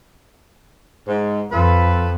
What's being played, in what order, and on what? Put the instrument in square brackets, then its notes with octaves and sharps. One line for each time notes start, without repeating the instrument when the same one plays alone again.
[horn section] G#2
[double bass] F2 [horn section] F4 A4 B4